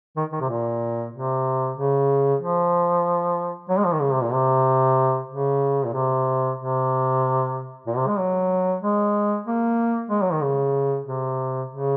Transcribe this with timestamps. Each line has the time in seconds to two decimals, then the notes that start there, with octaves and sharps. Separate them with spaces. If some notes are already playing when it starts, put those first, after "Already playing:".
0.17 D#3
0.32 D#3
0.41 C3
0.49 A#2
1.13 C3
1.77 C#3
2.41 F3
3.69 F#3
3.78 G#3
3.85 F3
3.93 D#3
4.01 C#3
4.13 C3
4.23 A#2
4.33 C3
5.30 C#3
5.85 A#2
5.93 C3
6.58 C3
7.86 A#2
7.96 C3
8.07 G#3
8.19 F#3
8.82 G#3
9.47 A#3
10.10 G#3
10.22 F#3
10.32 D#3
10.42 C#3
11.06 C3
11.70 C#3